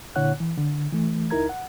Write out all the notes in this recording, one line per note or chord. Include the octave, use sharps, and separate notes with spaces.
A#2 D3 E4 C#5 F#5 F#6
E3
D3
E3 A3
C#2 D#4 E4 A#4 A#5 G#6
F#5